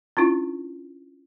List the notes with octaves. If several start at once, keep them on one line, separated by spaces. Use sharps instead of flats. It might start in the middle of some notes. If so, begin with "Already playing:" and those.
C#4 D4 E4 F4